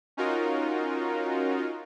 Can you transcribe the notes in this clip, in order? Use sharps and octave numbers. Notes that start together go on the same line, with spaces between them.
C#4 D#4 F4 F#4 A#4